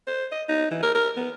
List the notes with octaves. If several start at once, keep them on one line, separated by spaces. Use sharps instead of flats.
C5
D#5
D#4
E3
A#4
A#4
B3